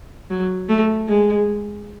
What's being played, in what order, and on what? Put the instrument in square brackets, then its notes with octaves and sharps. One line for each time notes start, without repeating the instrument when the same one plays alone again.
[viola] F#3
A3
G#3